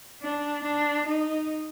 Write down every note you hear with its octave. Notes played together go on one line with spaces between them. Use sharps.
D4
D4
D#4